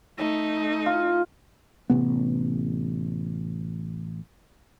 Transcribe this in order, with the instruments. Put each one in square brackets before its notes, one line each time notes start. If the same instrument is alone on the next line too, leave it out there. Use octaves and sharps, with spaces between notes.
[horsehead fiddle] A3 D#4
[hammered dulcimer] F4
[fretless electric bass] A1 C3 B3